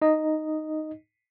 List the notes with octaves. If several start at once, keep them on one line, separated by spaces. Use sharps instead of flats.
D#4 D#5